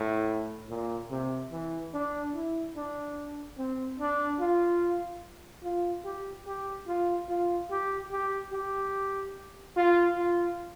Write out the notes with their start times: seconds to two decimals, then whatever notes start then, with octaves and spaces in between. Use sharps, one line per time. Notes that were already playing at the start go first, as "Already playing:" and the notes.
Already playing: A2
0.69 A#2
1.11 C3
1.52 E3
1.93 D4
2.34 E4
2.76 D4
3.58 C4
3.99 D4
4.40 F4
5.64 F4
6.05 G4
6.46 G4
6.87 F4
7.29 F4
7.70 G4
8.11 G4
8.53 G4
9.76 F4
10.17 F4